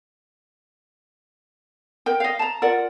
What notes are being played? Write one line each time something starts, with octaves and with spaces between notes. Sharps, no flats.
A#4 G5
D#5 F5
A5 A#5
F4 A#4 D5 F#5